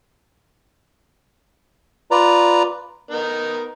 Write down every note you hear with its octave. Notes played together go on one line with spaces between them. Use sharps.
F4 B4 D5 A#5
B3 D#4 A#4